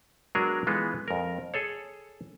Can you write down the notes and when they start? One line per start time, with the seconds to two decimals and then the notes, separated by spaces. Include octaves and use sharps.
0.35 F#3 G#3 B3 D4 G#4 A#4
0.67 E3 G#3 B3 F4 A4
1.08 F2 A#4
1.54 G#4 A4 C#5